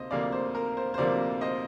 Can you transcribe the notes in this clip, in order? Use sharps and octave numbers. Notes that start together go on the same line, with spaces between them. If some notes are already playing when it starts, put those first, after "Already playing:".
Already playing: D2 C3 A#3 C5 D#5
D2 C3 F3 A#3 D5 F5
C5
A#4
C5
C5
D2 C3 F3 A#3 A#4 D5
C5 D#5